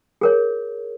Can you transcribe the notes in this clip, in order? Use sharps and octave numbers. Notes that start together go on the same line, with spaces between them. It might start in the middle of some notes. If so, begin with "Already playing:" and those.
G#4 A#4 C#5